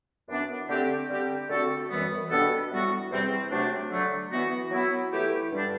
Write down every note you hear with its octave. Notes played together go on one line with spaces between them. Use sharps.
F#2 E3 B3 D4
D3 A3 C4 G4
D3 G3 C4 G4
D3 A3 C4 F#4 A4
F#2 E3 G3 B3
B2 G3 B3 D4 A4
A2 G3 B3 F#4
E2 C3 G3 C4
C3 F#3 A3 D4
D3 F#3 A3
E3 B3 F#4
F#3 B3 E4
E3 A3 E4 G4
G2 D3 G3 D4